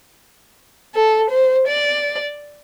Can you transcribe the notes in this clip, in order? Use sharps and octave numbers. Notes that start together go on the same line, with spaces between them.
A4
C5
D5